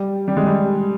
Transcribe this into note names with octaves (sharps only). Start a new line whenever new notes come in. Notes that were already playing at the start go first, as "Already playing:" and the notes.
Already playing: G3
G3
G#3
G3